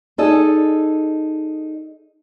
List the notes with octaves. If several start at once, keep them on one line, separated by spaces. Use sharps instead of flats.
D#4 G#4 A4 D5 D#5